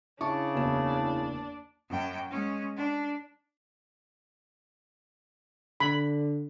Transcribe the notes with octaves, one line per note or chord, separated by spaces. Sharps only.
C#3 D4 E4 A5 C#6
F#1 E2 E7
F#2 G5
G#3 C#4
D4
D3 B5